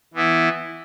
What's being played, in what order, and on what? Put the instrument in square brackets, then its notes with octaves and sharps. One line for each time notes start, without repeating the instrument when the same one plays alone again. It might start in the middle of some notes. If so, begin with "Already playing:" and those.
[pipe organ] E3 B3 E4